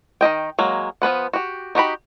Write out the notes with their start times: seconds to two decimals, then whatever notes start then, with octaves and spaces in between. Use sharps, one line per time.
0.21 D#3 F4 D#5 G5
0.59 F#3 G#3 A#3
1.02 F3 B3 B4 F#5
1.33 F#4 G4
1.75 D#4 F#4 G4 B5